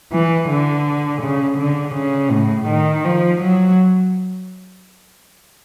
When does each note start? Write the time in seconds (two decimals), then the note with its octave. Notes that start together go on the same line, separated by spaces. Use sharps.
0.12 E3
0.49 D3
1.22 C#3
1.59 D3
1.95 C#3
2.31 A2
2.69 D#3
3.04 F3
3.41 F#3